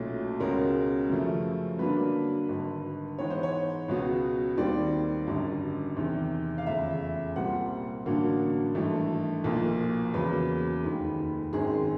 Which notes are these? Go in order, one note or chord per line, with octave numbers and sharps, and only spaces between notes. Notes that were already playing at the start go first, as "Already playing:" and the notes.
Already playing: B1 A#2 F#3 A3 C#4
C#2 B2 G#3 C#4 A#4
F#2 C#3 F3 A3
G2 D3 F#3 A#3 D4 B4
G#1 G2 D3
G#2 E3 G#3 B3 C#5
C5
C#5
C#2 B2 F#3 B3
D#2 D#3 G3 C4 D5
G#1 F#2 D3 G3
E2 C3 D#3
F5
F1 E2 C#3 E5
C2 A#2 G3 C4 F#5
A1 G2 D3 F#3 A#3
G#1 G2 E3 A3
B1 A#2 F3 A#3
E2 C#3 F#3 A#3 B4
F1 D#2 D#3 G#3
G#1 F#2 D#3 G#3 C4 G#4